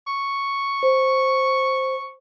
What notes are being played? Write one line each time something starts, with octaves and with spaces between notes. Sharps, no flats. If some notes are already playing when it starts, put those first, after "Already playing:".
C#6
C5